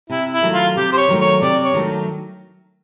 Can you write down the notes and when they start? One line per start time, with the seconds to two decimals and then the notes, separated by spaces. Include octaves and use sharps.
0.10 C3 E4
0.32 E4
0.43 D#3 F#3 A3
0.53 F4
0.76 C3 G4
0.92 C5
0.97 C#5
1.09 D#3 F#3 A3
1.20 C#5
1.42 C3 D5
1.64 C#5
1.74 D#3 F#3 A3